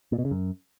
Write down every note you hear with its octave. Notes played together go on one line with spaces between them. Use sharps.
A#2
B2
C#3
F#2